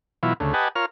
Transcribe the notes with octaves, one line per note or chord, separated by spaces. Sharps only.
B2 E3 F#3 E4 F4
D2 C#3 A3
G4 B4 D#5 F#5 G#5 A5
F4 A#4 C#5 F6